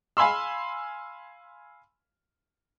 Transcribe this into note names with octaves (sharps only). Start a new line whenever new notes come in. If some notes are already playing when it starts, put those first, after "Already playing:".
F5 G#5 B5 C6 E6